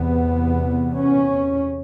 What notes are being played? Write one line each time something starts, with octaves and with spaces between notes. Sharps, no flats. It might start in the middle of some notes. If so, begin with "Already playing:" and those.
Already playing: E2 C3 B3
C#4